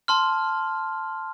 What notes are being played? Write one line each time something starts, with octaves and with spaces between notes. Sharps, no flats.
A5 C6 F6